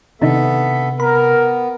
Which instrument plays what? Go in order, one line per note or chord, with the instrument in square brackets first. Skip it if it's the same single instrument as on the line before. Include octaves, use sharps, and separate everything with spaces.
[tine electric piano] C3 [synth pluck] D#3 D4 D#4 [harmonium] B3 A4 E5
[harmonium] B3 [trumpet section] A#4 [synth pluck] B5